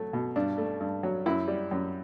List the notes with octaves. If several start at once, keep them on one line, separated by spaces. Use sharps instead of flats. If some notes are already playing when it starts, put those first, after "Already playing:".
Already playing: F#3 A3
B2
G2 D4
A3
G2
F#3
F#2 E4
G3
F#2